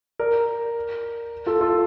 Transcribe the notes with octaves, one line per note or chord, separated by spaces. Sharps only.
A#4 D5
F4 A4
F4 A4